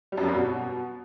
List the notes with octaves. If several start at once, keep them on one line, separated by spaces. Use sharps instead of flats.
G3
F#2
F2
G2
B2